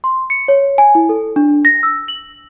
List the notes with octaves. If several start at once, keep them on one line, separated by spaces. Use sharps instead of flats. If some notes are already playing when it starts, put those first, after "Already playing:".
C6
C#7
C#5
G#5
E4
A4
D4
A#6
E6
F#7